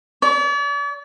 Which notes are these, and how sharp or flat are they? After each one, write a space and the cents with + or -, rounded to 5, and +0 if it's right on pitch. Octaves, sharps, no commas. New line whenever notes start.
D5 -45